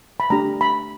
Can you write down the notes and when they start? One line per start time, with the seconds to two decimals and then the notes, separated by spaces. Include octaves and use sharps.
0.20 B5
0.30 A3 D4 G4 A#5
0.61 B5